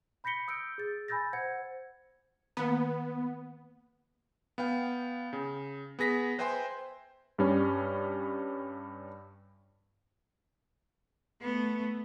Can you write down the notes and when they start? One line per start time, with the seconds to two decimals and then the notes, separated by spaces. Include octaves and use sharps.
0.24 B5 G6 A#6 B6 C#7 G7
0.48 D#6 E6 G6 C#7 D7
0.78 G#4 A6
1.08 G#5 B5 E6 G6 A6 A#6
1.33 C5 F#5 G#6 C#7
2.57 D#3 A#3 B3
4.58 B3 F5 G5
5.33 C#3
5.99 B3 G#4 A#6 B6
6.38 B4 C5 E5 G5 G#5 C6
7.38 G2 G3 C#4
11.42 A3 B3